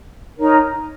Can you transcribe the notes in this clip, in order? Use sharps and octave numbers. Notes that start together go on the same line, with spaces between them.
D#4 A#4 C#5